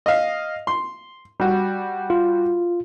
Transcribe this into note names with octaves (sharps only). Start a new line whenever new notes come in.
D#5 F5
C6
G3 F#4
F4